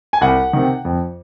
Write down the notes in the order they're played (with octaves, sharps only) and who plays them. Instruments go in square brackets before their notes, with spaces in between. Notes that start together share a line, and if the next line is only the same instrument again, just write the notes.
[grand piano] G#5
C2 F#5
C3 D#3
F2